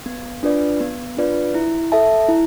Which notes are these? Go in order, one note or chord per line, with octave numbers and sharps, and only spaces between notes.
B3
D4 F4 B4 D5
B3
D4 F4 B4 D5
E4
A4 E5 A5
E4